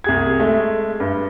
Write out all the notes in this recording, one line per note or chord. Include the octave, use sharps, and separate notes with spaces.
C2 G#4 G#6
G#3 A3
G2